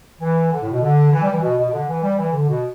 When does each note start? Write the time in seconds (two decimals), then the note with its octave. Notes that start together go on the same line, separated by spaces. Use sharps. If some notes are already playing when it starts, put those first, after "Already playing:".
0.20 E3
0.51 D3
0.61 A2
0.71 B2
0.81 D3
1.12 E3
1.22 G3
1.32 E3
1.42 B2
1.57 B2
1.68 B2
1.72 D3
1.88 E3
2.02 G3
2.17 E3
2.32 D3
2.48 B2